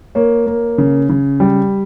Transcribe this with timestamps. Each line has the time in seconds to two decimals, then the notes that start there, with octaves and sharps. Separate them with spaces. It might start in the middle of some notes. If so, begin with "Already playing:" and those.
0.15 A#3 C#5
0.46 A#3
0.78 C#3
1.09 C#3
1.40 G3